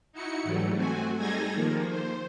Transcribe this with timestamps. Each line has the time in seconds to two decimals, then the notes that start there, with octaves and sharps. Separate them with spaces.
0.12 D#4 E4 F#4 C#7
0.43 G#2 E3 F#3 G3 A3
0.75 A3 C4 F#4 G#5
1.18 G3 D#4 G#4 A4 G#6 A#6
1.54 D#3 F3 A#3
1.90 C5